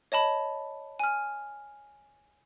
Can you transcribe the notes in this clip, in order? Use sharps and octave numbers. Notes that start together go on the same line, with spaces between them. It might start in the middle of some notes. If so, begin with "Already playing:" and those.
C#5 D#5 A5 B5
G#5 F6